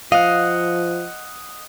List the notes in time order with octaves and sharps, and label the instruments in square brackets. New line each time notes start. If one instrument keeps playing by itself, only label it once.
[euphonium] F3 [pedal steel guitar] D#5 F#5 [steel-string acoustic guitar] F5